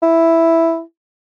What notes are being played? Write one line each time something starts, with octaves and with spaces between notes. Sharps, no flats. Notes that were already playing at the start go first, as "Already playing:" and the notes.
E4